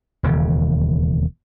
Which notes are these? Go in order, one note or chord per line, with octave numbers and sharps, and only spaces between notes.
E1 D#2 C#3